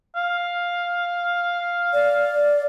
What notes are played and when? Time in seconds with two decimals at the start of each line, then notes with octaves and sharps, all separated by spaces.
0.16 F5
1.93 D5